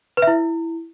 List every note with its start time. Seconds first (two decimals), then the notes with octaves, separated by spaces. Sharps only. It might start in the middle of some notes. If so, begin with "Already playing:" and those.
0.17 B4
0.22 E5
0.27 E4